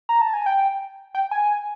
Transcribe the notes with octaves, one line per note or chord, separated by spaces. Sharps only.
A#5
A5
G#5
G5
G5
G#5